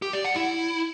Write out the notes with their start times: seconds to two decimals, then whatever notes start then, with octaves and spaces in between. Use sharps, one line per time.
0.02 G4
0.13 D5
0.25 F#5
0.36 E4